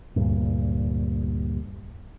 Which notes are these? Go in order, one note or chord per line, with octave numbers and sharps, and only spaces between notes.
D2 G2 A#2